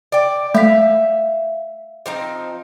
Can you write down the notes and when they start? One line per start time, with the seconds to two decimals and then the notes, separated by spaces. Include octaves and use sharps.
0.12 D5 G5
0.54 A3 E5 F5 B6
2.06 F3 C4 D#4